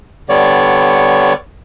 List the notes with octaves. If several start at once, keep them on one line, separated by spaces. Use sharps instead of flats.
D3 G3 B3 C#5 D5